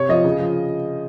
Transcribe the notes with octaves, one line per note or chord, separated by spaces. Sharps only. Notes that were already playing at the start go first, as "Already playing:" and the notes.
Already playing: C3 C#5
F3 D#5
C#3
F3